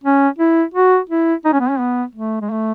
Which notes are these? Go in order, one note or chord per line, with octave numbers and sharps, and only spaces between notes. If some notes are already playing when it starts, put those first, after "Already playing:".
C#4
E4
F#4
E4
D#4
C#4
B3
C#4
B3
A3
G#3
A3